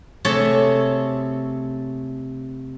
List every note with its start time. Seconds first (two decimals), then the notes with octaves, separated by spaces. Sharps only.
0.25 C3 A3 G#4 A4 C#5 A5